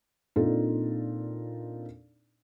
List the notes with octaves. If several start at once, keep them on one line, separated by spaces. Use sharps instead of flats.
A#2 C4 D4 D#4 F4 A4